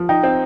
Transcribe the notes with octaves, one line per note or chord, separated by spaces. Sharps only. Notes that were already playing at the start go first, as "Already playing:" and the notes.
Already playing: F3
D#4 G5
C4